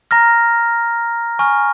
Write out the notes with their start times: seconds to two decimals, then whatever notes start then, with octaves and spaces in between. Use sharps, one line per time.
0.11 A#5 F6 A#6
1.39 G#5 C#6 F6